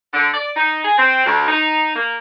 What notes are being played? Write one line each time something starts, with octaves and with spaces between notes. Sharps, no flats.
D3
D5
D#4
G#4
C4
D2
D#4
A#3